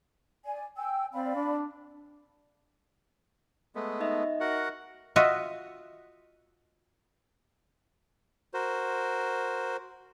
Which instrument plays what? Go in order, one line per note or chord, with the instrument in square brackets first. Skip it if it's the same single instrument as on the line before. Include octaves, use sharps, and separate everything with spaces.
[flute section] D5 G#5
G5 G#5 E6
[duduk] C4 [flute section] D5 F5 B5
[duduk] D4
[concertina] G#3 A3 B3
[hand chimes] D#4 D#5 E5
[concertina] F#4 A#4 F#5
[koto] F4 F#4 D#5 E5
[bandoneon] F#4 A#4 C5